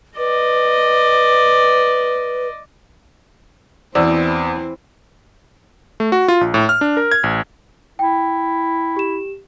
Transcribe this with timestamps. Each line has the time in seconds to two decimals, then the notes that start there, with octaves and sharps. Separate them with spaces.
0.18 B4 D5 D#5
3.95 E2 E3 C4 E4 F#4 C5 D5 E6
6.00 A3
6.12 F#4
6.28 F4
6.41 A#1
6.54 A2
6.69 F6
6.81 D4
6.97 A#4
7.12 G#6
7.24 A1
7.99 E4 G5
8.96 G4 E7